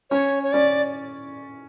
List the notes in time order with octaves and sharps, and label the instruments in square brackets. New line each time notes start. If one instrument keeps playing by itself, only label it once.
[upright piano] C#4 [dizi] C#5
[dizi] C#5
[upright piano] C#4 [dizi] D5